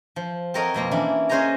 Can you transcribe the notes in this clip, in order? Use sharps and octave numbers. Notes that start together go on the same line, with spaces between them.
F3
C4 A4 A#4 C#5 D#5 F#5
F2 B2 A#3 F4
E3 C#4 D4 E4
C#4 G#4 C5 D#5 G#5 A#5